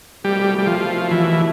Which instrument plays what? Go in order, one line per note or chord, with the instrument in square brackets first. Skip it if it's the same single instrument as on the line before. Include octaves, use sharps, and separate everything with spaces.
[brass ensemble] C2 B2 A3 [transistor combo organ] G3
[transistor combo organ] G3
F3
E3